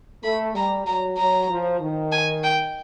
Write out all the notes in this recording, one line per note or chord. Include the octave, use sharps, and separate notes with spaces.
A3 B5
G3 A#5
F#3 A#5
F#3 A#5
F3
D#3
G#5
G5